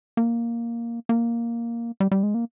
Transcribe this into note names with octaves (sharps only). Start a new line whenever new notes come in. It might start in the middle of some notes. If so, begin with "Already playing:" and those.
A#3
A#3
G3
G3
G#3
A#3